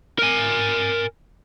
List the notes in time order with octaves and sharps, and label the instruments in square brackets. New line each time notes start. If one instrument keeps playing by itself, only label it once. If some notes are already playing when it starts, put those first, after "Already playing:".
[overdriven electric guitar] A#4 G#5